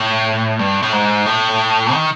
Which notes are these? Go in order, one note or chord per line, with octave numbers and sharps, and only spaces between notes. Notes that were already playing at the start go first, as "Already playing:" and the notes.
Already playing: A2
G2
A2
G#2
A2
D#3